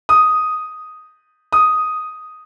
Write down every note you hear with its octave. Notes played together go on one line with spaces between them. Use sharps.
D#6
D#6